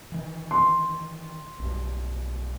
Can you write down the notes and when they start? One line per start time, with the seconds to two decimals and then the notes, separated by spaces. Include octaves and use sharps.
0.12 D#3 E3
0.51 C6
1.59 B1 G2